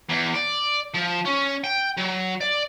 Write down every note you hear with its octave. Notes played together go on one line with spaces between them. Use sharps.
E2
D5
F3
C#4
G5
F#3
D5